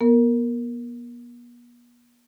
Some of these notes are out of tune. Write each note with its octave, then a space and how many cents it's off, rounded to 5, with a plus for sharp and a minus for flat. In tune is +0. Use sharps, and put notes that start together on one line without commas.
B3 -40 A#4 -10